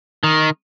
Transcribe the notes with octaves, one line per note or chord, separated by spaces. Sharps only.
D#3